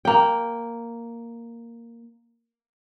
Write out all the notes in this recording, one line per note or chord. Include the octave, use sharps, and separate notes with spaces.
A#3 G5